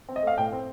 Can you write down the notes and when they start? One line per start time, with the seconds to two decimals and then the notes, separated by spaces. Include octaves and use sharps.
0.09 C4
0.16 D#5
0.23 A3 F5
0.38 A2 G5
0.53 C4